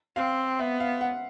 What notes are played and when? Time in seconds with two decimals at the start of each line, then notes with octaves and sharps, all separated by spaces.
0.16 C4 F5
0.59 B3 E5
0.80 F5
1.01 F#5